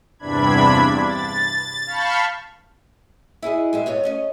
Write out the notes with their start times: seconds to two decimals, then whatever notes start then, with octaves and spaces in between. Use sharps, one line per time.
0.19 E2 G2 C3 D4 B5 G#6
1.03 A6
1.86 F5 A5 B5 C#6 F6 G6
3.42 E4 F#4 G#4 D#5
3.73 G#3 G4 E5
3.86 G2 F#4 C#5 D#5
4.03 A3 C#4 D#5